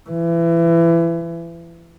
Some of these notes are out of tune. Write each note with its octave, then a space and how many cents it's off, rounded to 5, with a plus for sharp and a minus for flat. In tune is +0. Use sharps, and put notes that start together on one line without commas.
E3 +25